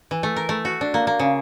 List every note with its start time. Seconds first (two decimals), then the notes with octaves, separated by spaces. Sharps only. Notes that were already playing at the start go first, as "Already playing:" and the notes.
0.11 E3
0.23 A3
0.36 A#4
0.49 A3
0.65 F#4
0.81 D4
0.94 A#3
1.07 A#3
1.19 C#3